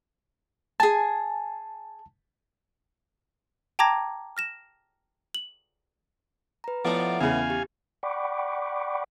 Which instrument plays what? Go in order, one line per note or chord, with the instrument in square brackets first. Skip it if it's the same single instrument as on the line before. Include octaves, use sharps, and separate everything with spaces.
[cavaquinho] G#4 G#5 [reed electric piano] A5
[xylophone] G5 A5 A#5 D6 G#6 A#6
F6 A#6 E7
F#7
[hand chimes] B4 A#5
[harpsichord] A2 A3 B3 [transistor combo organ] F3 D5
[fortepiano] E2 C#3 [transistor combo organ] F5 G#5
[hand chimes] G4
[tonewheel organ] D5 F#5 G5 B5 C#6 D6